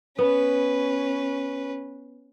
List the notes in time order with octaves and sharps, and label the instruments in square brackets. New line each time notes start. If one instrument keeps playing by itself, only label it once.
[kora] B3 [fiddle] C#4 B4